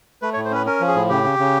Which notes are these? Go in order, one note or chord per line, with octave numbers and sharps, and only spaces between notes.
A3 B4
C#5
A2
C5
C#4 B4
C#4 A#4
F3
G#4
A2
C#3 G4
C#3
C#3